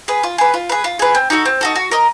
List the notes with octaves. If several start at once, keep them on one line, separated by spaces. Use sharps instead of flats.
G#4 B4
F4
G#4 B4
F4
G#4 B4
F4
G#4 B4
C4
D#4 F#4 A4
C4
D#4 F#4 A4
F#4
A#4 D#5